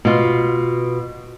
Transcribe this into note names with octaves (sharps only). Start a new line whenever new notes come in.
B2 F4